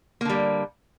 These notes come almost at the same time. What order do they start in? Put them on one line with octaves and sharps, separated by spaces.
A#3 D3 G3